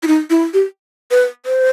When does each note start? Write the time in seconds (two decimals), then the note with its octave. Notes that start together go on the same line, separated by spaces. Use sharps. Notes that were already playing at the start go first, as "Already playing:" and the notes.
0.03 E4
0.07 D#4
0.30 E4
0.54 G4
1.11 B4
1.46 C5